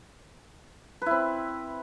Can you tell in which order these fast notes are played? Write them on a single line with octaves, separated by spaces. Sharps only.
B4 E4 C4